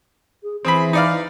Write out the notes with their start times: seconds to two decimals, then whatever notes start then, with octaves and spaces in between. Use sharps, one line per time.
0.43 G#4
0.65 E3 C4 G#4 B5
0.93 D#4 D5 F5